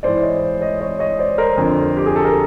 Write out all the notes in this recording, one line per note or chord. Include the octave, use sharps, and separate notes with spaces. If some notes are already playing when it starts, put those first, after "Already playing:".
G#2 E3 C5 D5
C#5 D#5
C#5 D#5
C#5 D#5
C#5 D#5
C5 D5
A#4 C5
F2 D3
G4
G#4
A4
A#4